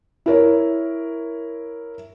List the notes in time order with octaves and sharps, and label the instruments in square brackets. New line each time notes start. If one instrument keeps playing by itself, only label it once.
[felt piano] E4 A#4 C#5